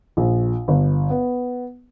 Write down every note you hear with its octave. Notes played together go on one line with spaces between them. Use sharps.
A#1
G1
B3